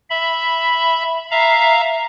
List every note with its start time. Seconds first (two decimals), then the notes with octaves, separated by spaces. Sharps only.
0.10 E5 B5
1.31 E5 F5 A#5